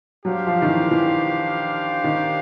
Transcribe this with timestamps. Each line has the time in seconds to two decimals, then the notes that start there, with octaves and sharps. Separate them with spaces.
0.25 F#3 D4 G4 C5 F5
0.47 F3
0.62 D#3
0.69 E3
0.91 E3
2.04 D#3